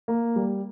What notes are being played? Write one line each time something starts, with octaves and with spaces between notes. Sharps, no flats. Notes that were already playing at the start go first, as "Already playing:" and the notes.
A#3
G3